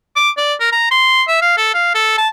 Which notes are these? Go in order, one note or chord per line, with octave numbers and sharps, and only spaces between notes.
D6
D5
A#4
A#5
C6
E5
F5
A4
F5
A4
A5